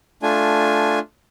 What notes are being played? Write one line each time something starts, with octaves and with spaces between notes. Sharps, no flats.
A3 D4 F4 G#5